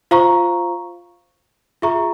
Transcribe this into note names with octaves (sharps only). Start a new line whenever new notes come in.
F4 C5 F5 A#5 C#6
F4 G#4 E5 A#5 C#6